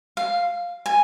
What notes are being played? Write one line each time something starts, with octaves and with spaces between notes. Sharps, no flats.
F5
G#5